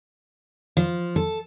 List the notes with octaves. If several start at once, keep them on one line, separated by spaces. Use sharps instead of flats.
F3
A4